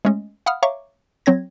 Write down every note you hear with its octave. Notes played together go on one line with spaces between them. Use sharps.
G#3 A3 C#4 D#5
F5 F#5 B5 D#6 F6
C#5 E5 F5 A#5 C#6 D6
F#3 C4 C#5 G#6 A#6